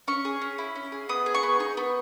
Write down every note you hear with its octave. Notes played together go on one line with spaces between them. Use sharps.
C#4 C#6
G#4
C#4
E4
C#4
G#4
B3 D#6
G#4
C#6
B3
D#4 C#6
B3